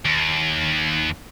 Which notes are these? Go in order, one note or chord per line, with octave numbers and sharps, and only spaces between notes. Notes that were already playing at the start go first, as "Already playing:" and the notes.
D#2